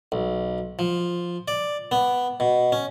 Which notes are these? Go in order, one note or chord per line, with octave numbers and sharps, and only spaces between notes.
B1
F3
D5
B3
B2
C#4